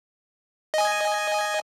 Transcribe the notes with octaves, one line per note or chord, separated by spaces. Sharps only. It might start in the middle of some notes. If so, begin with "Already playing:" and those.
D#5 G#5